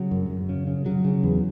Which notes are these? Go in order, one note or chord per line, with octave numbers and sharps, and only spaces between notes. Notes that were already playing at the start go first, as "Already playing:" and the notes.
Already playing: C#3 F#3
F#2
F#2
C#3
C#3
C#3 F#3
C#3
E2